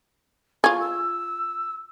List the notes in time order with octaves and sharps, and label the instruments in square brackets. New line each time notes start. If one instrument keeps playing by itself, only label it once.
[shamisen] F4 G#4 [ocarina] C#6
[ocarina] E6